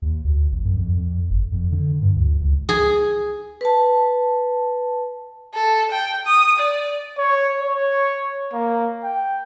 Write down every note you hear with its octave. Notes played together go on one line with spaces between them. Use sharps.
D#2
D2
A#1
F#2
F2
F2
G1
F2
D3
G2
D2
C#2
G#4
B4 A5
A4
G5
D#6
D5
C#5
C#5
A#3
G5